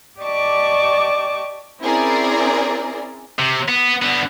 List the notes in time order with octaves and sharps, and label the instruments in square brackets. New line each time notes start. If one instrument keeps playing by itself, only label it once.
[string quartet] G4 D5 D#5 A5 C#6 D6
[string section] C4 C#4 E4 G#4 A#4 D5
[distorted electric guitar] C3
B3
D3 B3